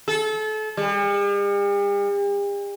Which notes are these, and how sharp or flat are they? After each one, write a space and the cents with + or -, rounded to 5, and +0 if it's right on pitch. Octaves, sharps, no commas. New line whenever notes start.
A4 -30
G3 +45